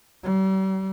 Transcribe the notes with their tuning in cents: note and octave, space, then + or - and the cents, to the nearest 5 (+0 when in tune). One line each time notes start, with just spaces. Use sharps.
G3 -45